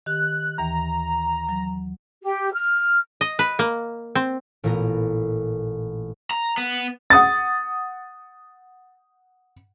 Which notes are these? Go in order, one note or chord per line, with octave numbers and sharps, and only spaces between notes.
D#3 G4 F#6
D#2 E3 A#5
F#3
G4
F6
D#5
B4
A#3
C4
A1 A#2 B3 A#5
A#5
B3
F#5 D#6 A6